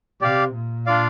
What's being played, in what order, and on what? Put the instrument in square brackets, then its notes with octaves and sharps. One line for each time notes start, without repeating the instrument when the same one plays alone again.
[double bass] C3 [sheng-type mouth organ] G4 D5 F5
[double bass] A#2
[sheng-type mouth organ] D4 F4 D5 F5